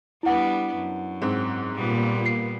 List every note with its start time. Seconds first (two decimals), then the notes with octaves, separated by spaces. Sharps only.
0.23 G3 B3 D4 E4 F#5
0.75 F#2
1.22 G#2 C4
1.76 A#2 G3 B3 F4
2.26 C7